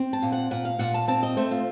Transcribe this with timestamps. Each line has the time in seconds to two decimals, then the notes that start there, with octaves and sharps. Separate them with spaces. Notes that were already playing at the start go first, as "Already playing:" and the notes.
Already playing: C4
0.13 A5
0.22 A#2
0.32 F#5
0.51 A#2 F#5
0.65 F5
0.79 A#2 F#5
0.94 A5
1.08 C4 A5
1.23 D#5
1.37 A3 C5
1.51 F4